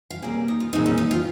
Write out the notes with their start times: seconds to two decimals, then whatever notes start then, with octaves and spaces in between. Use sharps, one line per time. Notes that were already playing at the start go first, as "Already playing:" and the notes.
0.10 F5
0.22 C3 G3 A#3 C#4 G#4
0.48 D#4
0.60 F4
0.73 A#2 G#3 C4 D#4
0.86 C#4
0.98 D#4
1.11 F4